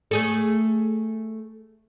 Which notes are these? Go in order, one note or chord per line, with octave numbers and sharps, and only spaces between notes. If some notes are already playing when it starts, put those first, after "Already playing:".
A3 G#4 A4